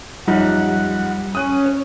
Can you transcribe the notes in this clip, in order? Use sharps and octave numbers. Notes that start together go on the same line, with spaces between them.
F#2 F3 G3 D#4 F#5
C#4 D#6 F#6 D#7
C#5